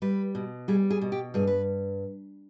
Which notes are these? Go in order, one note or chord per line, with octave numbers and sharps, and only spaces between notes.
G3 B4
B2
G3 G#4
G#4
B2
G4
G2 G#4
B4